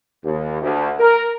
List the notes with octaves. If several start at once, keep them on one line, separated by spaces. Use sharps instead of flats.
D#2
D2
A#4